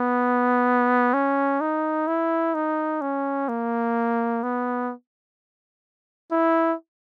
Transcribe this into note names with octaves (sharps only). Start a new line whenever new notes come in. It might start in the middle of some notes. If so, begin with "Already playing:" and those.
Already playing: B3
C#4
D#4
E4
D#4
C#4
A#3
B3
E4